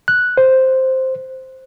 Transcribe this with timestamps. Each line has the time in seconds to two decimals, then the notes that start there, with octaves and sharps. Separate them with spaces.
0.08 F#6
0.37 C5